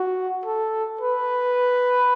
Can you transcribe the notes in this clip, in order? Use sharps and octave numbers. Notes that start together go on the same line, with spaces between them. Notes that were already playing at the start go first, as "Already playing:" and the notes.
Already playing: F#4
A4
B4